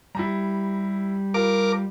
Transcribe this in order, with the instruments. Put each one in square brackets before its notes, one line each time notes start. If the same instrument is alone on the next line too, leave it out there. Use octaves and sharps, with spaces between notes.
[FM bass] G3 [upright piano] E4 A#5
[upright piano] F4 [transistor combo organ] A#4 D6